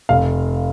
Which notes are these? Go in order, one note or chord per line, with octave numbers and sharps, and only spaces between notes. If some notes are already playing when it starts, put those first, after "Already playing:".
F1 F5